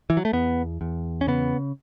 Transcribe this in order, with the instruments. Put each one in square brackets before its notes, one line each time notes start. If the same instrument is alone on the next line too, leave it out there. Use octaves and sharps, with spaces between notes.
[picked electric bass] E3
F#3
A3
E2 B3
E2
C#4
C#3 B3